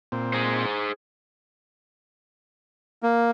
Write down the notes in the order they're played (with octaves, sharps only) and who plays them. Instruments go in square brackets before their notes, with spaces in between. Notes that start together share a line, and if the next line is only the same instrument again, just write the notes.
[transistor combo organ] A#2 C4
[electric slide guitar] G#4 C5
[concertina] A#3